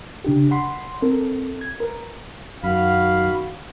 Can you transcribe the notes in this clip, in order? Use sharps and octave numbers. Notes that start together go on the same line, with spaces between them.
C#3 D4 G4
F#5 B5 C6
C4 A4 A#4
G#6
A#4 B4
F#2 D#3 F#4 F5 B5